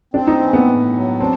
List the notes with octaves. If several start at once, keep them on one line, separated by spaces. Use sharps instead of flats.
C4 D4
D#4
E3
B3
A2
F#3
C4 D4